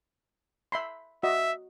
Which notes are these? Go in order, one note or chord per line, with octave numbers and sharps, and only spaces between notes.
E5 B5 C6
F#4 D#5 E5